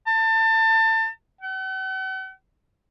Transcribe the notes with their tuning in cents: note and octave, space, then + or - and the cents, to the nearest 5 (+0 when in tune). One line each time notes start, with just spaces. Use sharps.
A5 +30
F#5 +45